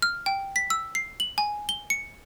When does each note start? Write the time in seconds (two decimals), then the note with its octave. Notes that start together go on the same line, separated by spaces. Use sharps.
0.02 F6
0.26 G5
0.56 B6
0.70 E6
0.95 C7
1.20 F#7
1.38 G#5
1.69 G7
1.90 C#7